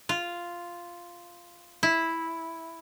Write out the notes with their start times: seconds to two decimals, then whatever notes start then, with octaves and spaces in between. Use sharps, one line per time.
0.09 F4
1.83 E4